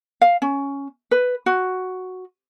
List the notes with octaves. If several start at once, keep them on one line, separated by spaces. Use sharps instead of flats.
F5
C#4
B4
F#4